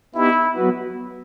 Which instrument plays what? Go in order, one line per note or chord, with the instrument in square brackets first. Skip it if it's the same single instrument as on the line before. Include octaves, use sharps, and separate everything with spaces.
[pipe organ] B3 D#4 G4 [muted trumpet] E4
[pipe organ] F#3 B3 F#4 B4